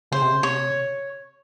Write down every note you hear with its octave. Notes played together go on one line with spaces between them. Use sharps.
C#3 C5
C3
C#3
C3 C#5